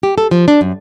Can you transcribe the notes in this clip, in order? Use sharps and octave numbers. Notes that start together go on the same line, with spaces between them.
G4
A4
F3
D4
F#2